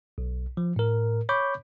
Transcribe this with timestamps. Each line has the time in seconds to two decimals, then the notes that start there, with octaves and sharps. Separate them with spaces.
0.18 B1
0.57 F3
0.76 A2 A#4
1.29 C#5 B5 C#6 D6 G6